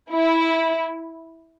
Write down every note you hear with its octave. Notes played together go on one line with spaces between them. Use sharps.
E4